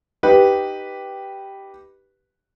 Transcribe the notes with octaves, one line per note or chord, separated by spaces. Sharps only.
D#4 G4 B4